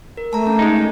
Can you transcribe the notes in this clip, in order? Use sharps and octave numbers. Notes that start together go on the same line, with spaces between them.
A#4
A3 A5 A#5
C#4 A#5
G#3 D#4